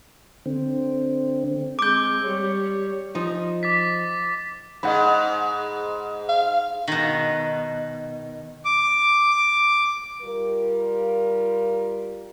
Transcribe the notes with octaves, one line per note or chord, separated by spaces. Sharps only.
D3 C4
G#3 C4 D6 G6
G3 C#5
F3 D#4
D6 A6 B6
G#2 D#5 F#5 B5
F5
B2 D#3
D6
G3 F4 A#4